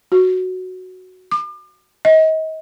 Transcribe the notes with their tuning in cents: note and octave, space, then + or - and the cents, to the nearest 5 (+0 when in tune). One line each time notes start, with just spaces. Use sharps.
F#4 +0
D6 +40
D#5 +35